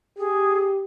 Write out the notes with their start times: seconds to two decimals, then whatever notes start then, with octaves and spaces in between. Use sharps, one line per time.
0.18 G4 G#4